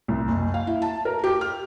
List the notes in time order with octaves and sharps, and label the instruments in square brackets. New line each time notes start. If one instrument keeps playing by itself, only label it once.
[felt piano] C2
F#1
F5
E4
A5
A#4
G4
F6